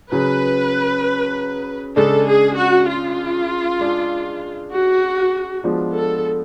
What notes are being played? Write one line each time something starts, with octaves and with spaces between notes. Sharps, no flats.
C#3 F#3 C#4 G#4 B4
C#3 G#3 D4 A4
G#4
F#4
F4
G#3 D4 G#4
F#4
F3 G#3 B3 D4 F4
A4